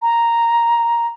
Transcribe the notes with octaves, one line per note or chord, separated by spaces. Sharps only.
A#5